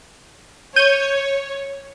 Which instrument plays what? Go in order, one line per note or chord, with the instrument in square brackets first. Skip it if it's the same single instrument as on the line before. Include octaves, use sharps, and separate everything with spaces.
[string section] C#5 [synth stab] G6 D#7